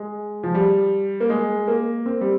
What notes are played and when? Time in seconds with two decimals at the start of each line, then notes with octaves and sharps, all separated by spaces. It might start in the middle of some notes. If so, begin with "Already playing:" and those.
Already playing: G#3
0.43 F3
0.54 G3
1.20 A#3
1.30 G#3
1.68 A#3
2.06 C4
2.21 G3